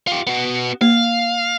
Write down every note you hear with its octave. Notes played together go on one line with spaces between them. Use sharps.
F4 G4
B3 F#4
A#3 F5